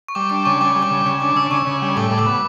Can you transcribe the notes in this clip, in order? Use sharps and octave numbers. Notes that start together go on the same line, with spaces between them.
C#6
G3 D6
D4 D6
C#3 C#6
G3 D6
G3
D6
C#3
C#3 C#6
D4 D6
C#3 E6
C#3 C#6
C#3
G3
A2 D6
A2
D6
B3